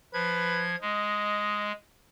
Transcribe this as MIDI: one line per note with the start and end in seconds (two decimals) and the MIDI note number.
0.14 0.76 53
0.14 0.64 71
0.14 0.76 92
0.82 1.72 56
0.82 1.73 75